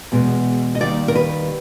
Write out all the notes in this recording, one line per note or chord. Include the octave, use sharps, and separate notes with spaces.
E2 B2 G#3
D#5
D#2 D#3 G3 D5
A#4
B4